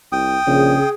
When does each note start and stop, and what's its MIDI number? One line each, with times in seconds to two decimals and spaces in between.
0.12 0.38 36
0.12 0.89 79
0.12 0.89 87
0.47 0.76 34
0.47 0.82 49
0.47 0.94 68